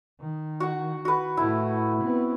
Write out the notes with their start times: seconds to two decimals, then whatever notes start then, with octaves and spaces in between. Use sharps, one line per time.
0.20 D#3
0.60 F#4 F#5
1.05 F#4 B4
1.37 A2 A3 E4
2.01 B3 C4